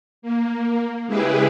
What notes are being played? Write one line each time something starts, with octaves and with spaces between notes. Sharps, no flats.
A#3
C#3 G#3 E4 G4 G#4 B4